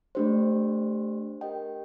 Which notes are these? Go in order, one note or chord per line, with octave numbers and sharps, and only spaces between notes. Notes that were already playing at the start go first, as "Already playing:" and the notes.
A3 D4 G4 C5
G4 A#4 D#5 G5